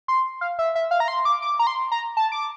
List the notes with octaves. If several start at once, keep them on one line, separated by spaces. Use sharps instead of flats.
C6
F5
E5
E5
F5
A#5
C6
D6
D6
A#5
C6
A#5
A5
D6